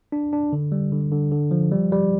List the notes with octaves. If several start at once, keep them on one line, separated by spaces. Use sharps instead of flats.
D4
D4
D3
G3
D3
D3
D3
F3
G3
G3